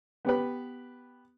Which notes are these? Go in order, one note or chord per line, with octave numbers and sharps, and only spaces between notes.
B3 G4 B4